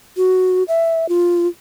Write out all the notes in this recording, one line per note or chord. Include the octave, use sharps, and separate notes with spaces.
F#4
E5
F4